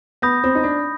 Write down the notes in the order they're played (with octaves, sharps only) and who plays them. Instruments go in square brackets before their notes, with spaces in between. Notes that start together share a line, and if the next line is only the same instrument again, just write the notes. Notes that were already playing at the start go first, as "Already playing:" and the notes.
[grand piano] B3 [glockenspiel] B5 D#6 G6 A#6
[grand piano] C4
D#4
D4